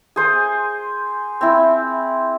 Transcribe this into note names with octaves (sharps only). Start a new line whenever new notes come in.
G#4 C5 G#5
C4 E4